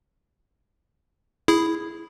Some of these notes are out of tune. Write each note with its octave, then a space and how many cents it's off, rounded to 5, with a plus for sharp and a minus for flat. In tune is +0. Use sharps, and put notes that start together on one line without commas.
E4 +0 G#4 +0 D#6 +0